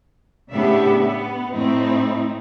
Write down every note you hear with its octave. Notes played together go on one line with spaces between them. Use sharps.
A2 C#3 B3 D4 G4 E5
B3
A2 A3 C4 D#4 E4